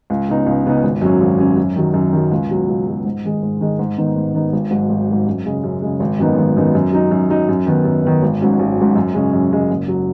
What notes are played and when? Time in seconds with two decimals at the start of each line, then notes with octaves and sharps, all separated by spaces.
0.10 C#2
0.29 C#3 B3 D#4
0.46 C#2
0.66 C#3 B3 D#4
0.84 G#1
1.01 F#2 F#3 C#4
1.20 G#1
1.38 F#2 F#3 C#4
1.57 F#2
1.76 D#3 F#3
1.94 F#2
2.13 D#3 F#3
2.31 C#2
2.50 B2 F#3
2.68 C#2
2.87 B2 F#3
3.05 G#2
3.24 D#3 G#3
3.43 G#2
3.61 D#3 G#3
3.79 G#2
3.97 D#3 B3 D#4
4.16 G#2
4.34 D#3 B3 D#4
4.53 G#1
4.71 G#2 F#3
4.89 G#1
5.09 G#2 F#3
5.26 F#2
5.46 C#3 G#3
5.64 F#2
5.82 C#3 G#3
6.00 G#1
6.19 F#2 D#3 B3 D#4
6.38 G#1
6.57 F#2 D#3 B3 D#4
6.75 F#2
6.92 F#3 D#4
7.11 F#2
7.29 F#3 D#4
7.49 F#2
7.67 D#3 B3
7.85 F#2
8.03 D#3 B3
8.22 G#1
8.41 G#2 F#3 C#4
8.59 G#1
8.78 G#2 F#3 C#4
8.95 F#2
9.14 C#3 G#3 C#4
9.33 F#2
9.52 C#3 G#3 C#4
9.70 F#1
9.88 F#3